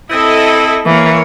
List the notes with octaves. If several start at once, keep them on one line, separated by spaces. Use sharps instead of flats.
C4 E4 A4 D#5
E3 A#3 C#5